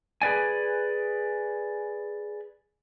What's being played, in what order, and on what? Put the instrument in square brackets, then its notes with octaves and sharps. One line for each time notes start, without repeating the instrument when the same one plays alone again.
[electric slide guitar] G#4 B4 D5 G#5